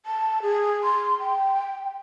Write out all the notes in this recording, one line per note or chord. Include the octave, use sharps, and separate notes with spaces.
A5
G#4
C6
G5